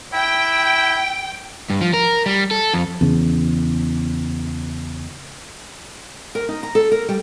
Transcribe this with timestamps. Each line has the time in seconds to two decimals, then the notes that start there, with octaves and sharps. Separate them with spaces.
0.14 E4 G5
1.70 G2
1.81 F3
1.94 A#4
2.26 G3
2.51 A4
2.73 F2
3.01 E2 C#3
6.35 A#4
6.49 D#4
6.63 A#5
6.75 A4
6.91 A#4
7.09 G3